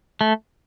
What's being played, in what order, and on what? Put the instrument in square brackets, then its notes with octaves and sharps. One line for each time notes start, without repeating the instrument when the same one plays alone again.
[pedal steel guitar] A3